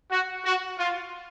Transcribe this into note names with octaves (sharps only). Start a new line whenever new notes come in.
F#4
F#4
F4